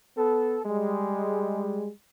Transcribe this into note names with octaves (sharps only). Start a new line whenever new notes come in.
B3 A4
G3 G#3